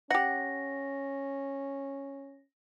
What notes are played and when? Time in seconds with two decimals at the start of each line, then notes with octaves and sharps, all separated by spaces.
0.11 C#4 G4 F#5 A#6